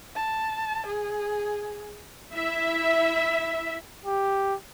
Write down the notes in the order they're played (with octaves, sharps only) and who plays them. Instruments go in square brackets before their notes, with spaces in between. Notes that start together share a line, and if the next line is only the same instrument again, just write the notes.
[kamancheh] A5
G#4
[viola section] E4 E5
[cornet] G4